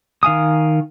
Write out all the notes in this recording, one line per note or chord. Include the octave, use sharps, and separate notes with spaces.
D#3 F5 G#5 D#6